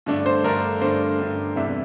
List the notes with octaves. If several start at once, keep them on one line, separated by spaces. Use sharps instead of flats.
G2 D3 A3 D4
C5
G2 D3 A3 D4 A#4
G2 D3 A3 D4 C5
G2 D3 A3 D4
E2 C3 E3 G3 E5